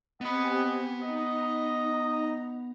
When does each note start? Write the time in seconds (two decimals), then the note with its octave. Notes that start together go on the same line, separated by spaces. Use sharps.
0.21 B3 C4 G4 D#5 F#5 G#5 B5
1.03 D#4 D#5 A#5